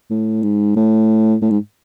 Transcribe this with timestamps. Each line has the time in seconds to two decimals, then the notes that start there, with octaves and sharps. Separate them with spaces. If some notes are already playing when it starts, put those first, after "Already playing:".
0.10 A2
0.42 G#2
0.76 A2
1.41 A2
1.50 G#2